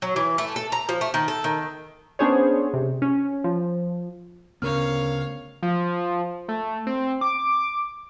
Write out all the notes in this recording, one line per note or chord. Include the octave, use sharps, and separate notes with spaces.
F#3
E3
A3
A4
A#5
F3
A3
D#3
A4
D#3
B3 C#4 D4 G#4 C5 C#5
C3
C#4
F3
D2 C#3 B3 C#4 A#4 C#5 F5 F6
F3
A3
C4
D6